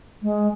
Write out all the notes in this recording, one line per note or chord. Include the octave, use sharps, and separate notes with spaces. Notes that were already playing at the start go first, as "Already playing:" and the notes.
G#3